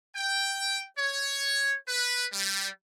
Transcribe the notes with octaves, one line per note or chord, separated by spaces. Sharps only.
G5
C#5
B4
G3